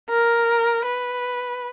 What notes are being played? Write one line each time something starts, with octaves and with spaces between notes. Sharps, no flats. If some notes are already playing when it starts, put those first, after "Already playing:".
A#4
B4